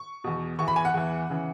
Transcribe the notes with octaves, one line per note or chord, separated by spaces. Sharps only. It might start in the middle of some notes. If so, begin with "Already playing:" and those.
Already playing: C#6
E2 B2
E2 E3 C#6
B5
G#5
F#5
E2 E3
C#3 E3